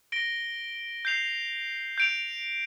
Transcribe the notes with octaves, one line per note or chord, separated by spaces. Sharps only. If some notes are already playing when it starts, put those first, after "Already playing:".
A#6 D7 G7
G6 C7 F7
G6 D7 F7